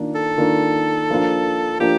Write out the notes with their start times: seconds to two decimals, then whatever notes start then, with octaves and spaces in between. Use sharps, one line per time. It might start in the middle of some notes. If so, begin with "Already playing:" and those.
Already playing: D#3 A#3 D4 F4
0.15 A4
0.38 D#3 A#3 D4 F4
1.10 F3 A#3 D4 F4
1.80 F3 A#3 D4 F4 G4